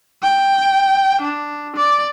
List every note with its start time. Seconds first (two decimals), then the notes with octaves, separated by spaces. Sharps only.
0.22 G5
1.21 D4
1.76 D5